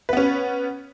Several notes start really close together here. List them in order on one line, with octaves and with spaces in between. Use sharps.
B4 B3 C#4